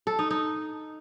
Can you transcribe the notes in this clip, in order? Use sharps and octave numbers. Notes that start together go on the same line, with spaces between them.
A4
D#4
D#4